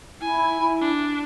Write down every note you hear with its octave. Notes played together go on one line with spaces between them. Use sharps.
E4 G#5
D4